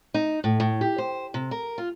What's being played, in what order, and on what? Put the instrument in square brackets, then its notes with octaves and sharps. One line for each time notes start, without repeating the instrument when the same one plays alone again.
[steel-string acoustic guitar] D#4
A2
A2
G4
C5
C3
A#4
F4